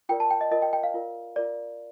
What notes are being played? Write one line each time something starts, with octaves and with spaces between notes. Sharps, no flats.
F4 A#4 D5 G5
A5
G5
D#5
F4 A#4 D5 D#5
G5
G5
F5
F4 A#4 D5
F4 A#4 D5